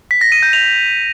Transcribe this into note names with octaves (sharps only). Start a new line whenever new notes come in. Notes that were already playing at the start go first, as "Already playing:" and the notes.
B6
A#6
D#7
G6
F7